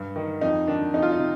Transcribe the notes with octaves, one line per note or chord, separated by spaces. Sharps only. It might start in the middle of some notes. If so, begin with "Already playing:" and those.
Already playing: G2
D#3
F2 D#4
D#3 D4
F2 D#4
F4
D#4
C3